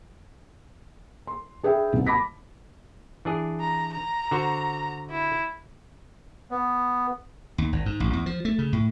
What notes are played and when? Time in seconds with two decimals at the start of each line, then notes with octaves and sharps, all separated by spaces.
1.27 C6
1.63 D4 G#4 B4 E5 G5
1.93 D#1 C2
2.07 A5 B5 D6 A#6 B6
3.25 E3 D4 G#4
3.61 A#5
3.93 A#5
4.31 D3 F#4 C5
5.10 E4
6.51 B3
7.58 D#2
7.72 G#1
7.86 G#2
8.00 A1
8.13 E2
8.26 F3
8.45 A3
8.59 C#3
8.73 A2